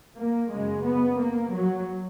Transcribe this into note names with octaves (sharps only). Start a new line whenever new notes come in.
A#3
F#2 C#3 G#3
B3
A#3
F#3